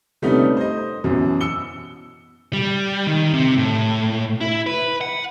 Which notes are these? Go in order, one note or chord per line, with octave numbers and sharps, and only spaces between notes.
C3 G3 A3 B3 C#4 D#4
C5 D#5
F#2 B2 E3
E6 C#7 G7
G3
D#3
C3
A2
E4
B4
F#5